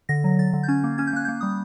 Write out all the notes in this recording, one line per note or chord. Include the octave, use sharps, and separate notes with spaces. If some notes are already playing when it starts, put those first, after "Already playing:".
D3 A#6
F#3
D3 A6
D3
G6
C#4 G#6
A#3
C#4 G#6
G6
A#3 F#6
A#3 G6
G3 D#6